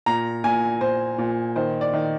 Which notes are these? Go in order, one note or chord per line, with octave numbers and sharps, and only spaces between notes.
A#2 A#5
A#2 G#5
A#2 C5
A#2
D#3 C5
D5
D#3